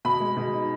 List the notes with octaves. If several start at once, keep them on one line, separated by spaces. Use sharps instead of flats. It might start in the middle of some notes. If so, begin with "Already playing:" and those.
B2 B5
G#3
B2
D#4